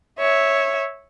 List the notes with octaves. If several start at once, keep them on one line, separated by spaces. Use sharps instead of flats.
C#5 E5